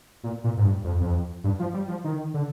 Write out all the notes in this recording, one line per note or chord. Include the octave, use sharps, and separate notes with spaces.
A#2
A#2
G#2
G2
F2
F2
G2
F3
G3
F3
D#3
D3